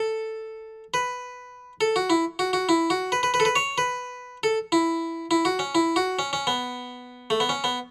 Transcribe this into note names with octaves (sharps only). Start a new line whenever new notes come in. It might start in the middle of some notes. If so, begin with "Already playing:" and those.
Already playing: A4
B4
A4
F#4
E4
F#4
F#4
E4
F#4
B4
B4
B4
A4
B4
C#5
B4
A4
E4
E4
F#4
C#4
E4
F#4
C#4
C#4
B3
A3
B3
C#4
B3